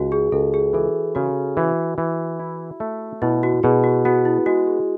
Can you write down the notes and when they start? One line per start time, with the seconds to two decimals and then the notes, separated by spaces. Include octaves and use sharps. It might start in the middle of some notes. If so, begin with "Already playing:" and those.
Already playing: C#2 F#4
0.12 G#4
0.32 C#2 A4
0.54 G#4
0.73 E3 A4
1.15 C#3 F#4
1.57 E3 F#4
1.98 E3
2.39 E4
2.80 A3
3.22 B2 E4
3.43 F#4
3.63 B2 G#4
3.84 F#4
4.05 B3 F#4
4.25 E4
4.46 G#3 F#4
4.67 G#4